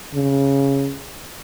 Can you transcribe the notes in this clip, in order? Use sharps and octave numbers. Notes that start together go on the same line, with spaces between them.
C#3